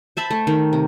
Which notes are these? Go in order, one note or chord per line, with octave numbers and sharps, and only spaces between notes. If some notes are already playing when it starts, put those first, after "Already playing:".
C5 E5 A5 B5
A3
D#3
C3